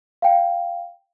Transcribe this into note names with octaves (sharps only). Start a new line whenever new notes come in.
F5 G5